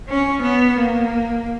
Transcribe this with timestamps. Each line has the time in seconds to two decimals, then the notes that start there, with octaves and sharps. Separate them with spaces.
0.09 C#4
0.42 B3
0.76 A#3